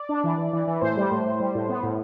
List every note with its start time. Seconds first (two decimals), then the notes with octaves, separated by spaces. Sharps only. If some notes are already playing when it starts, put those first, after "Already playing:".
Already playing: D5
0.09 D4
0.24 E3
0.38 E3
0.53 E3
0.67 E3
0.81 A2 C5
0.97 G3
1.11 A2
1.25 A2
1.40 G3
1.55 A2
1.69 B3
1.83 A2